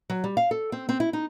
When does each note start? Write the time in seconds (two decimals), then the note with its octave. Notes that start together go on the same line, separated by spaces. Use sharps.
0.10 F#3
0.24 G3
0.37 F5
0.51 A4
0.72 C4
0.89 C4
1.00 E4
1.13 D#4